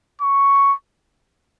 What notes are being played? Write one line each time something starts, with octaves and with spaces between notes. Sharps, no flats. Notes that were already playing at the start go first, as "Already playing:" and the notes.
C#6